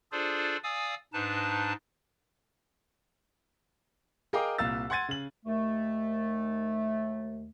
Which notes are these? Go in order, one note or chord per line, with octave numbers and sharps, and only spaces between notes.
D4 F4 G#4 A4 C5 D5
D5 F5 G#5 D#6 E6
G#2 D4 D#4 B4 A5
G#4 A#4 D#5 F5 G5 D6
C2 A#2 F5 E6 A6
F#5 C6 G#6 A6 D#7
C#3 F#7
D#2 A3